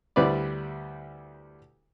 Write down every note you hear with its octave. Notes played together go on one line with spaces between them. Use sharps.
D2 G3 E4 B4 C5 D5